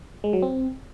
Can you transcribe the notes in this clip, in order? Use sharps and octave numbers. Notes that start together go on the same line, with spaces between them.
G#3
F#3
C4